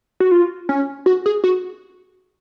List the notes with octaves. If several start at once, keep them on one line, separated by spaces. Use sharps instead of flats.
F#4
F4
C#4
F#4
G#4
F#4